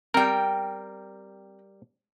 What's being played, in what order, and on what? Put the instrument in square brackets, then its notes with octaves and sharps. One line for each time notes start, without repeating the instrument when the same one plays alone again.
[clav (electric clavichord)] G3 A#4 [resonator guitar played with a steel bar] C4 G5